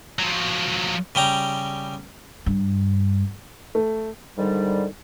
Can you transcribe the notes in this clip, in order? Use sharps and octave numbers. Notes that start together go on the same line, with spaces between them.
F3 F#3
C#3 G3 G5 A#5
G2
A3
G#2 D3 D#3 G3